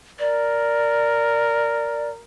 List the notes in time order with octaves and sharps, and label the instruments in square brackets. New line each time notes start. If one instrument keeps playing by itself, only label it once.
[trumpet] A#4 [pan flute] D5